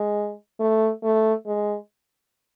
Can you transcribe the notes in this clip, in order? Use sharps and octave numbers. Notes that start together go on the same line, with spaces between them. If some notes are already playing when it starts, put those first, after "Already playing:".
Already playing: G#3
A3
A3
G#3